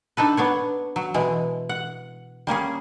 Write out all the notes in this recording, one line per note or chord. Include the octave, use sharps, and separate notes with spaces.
D4 D#4 A4 B4
B3 D4 C#5
F#3
B2 E3 G#3
F#5
G3 A#3 C#4 G#4